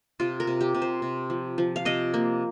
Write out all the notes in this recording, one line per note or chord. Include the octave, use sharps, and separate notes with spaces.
C3 F4
A#4
C3
G4
C3
C5
C3
F3
F3
F5
C3 D#5
A#3